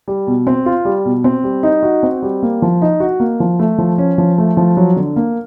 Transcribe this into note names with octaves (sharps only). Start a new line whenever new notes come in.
G3
B2
C4
F4
G3
B2
C4
G3
D#4
F#4
C4
G3
A#3
F3
D#4
F#4
A#3
F3
A3
F3
C#4
F3
A3
F3
F#3
D3
A#3